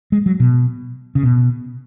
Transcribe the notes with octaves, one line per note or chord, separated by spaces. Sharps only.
G#3
F#3
B2
C#3
B2